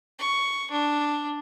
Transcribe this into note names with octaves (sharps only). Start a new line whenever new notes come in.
C#6
D4